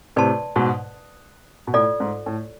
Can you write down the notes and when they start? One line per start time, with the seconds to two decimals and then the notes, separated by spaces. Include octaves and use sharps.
0.16 A2 C3 B4 D5 A5 C6
0.56 G#2 B2
1.67 B2
1.74 A2 F4 A4 D5
2.00 G#2
2.26 A2